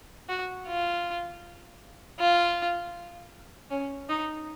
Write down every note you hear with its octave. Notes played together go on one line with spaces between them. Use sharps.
F#4
F4
F4
C#4
D#4